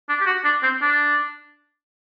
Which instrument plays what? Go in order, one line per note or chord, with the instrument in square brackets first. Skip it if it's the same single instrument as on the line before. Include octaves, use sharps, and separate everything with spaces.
[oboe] D4
G4
F#4
D4
C4
D4